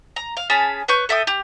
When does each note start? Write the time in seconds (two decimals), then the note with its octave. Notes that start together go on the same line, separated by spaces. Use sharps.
0.16 A#5
0.37 F5
0.50 C#4 G#4 A5 B5
0.88 B4 C#5 C#6 G6
1.09 A4 E5 G5 D#6
1.27 G4